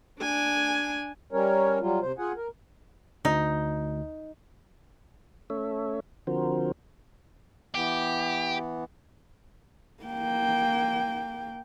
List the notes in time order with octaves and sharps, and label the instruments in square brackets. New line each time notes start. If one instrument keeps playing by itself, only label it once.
[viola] D4 G#5
[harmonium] G3 C#4 A#4 C#5
F#3 G3 F4
C3 C5
F4 G#4 F#5 G#5
A#4
[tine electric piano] D2 [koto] D#4
[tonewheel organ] A3 C#4 A4 C#5 E5
D3 F3 C4 F#4 A#4 C5
[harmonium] E3 B3 [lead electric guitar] G4
[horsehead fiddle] A#3 G5